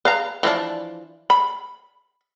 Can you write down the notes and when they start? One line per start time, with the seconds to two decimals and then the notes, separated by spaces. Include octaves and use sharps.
0.05 B4 F5 A#5
0.43 E3 F3 D4
1.30 B5